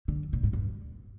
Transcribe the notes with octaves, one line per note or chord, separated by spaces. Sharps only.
D3
A#2
G#2
G2